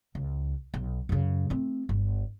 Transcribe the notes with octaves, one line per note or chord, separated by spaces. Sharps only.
C#2
B1
F#2 C#3
A3 C4
G1